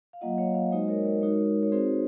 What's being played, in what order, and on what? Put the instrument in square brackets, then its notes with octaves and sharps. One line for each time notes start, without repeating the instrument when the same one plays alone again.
[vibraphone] F5
F#3 A#3 F4 D#5 F#5
C#5 F5
C#5 F5
G#3 D#4 F#4 C5 D#5
A#4 C#5
A#4 C#5
G#3 D#4 F#4
C#5
C4 D#4 F#4 G#4 C5